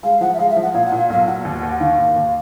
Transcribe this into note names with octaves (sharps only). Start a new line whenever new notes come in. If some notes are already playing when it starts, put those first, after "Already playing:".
G#3 F5
F3 F#5
E5
G#3 F5
E5
F3
F#5
A#2 F5
F#5
A#2
F5
B1 F5
A#2 F#5
D#2
D#2
D#3 F5
D#2
D#2